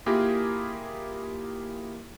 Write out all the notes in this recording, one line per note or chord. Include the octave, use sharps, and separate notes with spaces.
A#3 E4 F4 G4 G#4 A#4